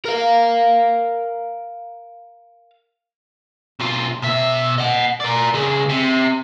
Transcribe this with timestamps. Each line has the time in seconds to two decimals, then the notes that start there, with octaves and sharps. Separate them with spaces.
0.05 A#4 F5
3.80 B1 F4
4.23 B2 E5
4.78 D#5 F#5
5.20 A#4 D5
5.54 C#2 G#3
5.89 C3